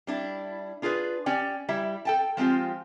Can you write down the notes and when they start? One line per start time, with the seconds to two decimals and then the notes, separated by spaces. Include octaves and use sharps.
0.07 G3 D4 E4
0.82 D4 F4 G#4 A#4 B4
1.26 C#4 G4 D5 G5
1.69 G3 E4 E5
2.05 A4 G5 A5
2.37 F3 G#3 C4 F4 G4